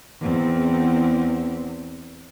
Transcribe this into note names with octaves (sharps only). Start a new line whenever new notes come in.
E2 C4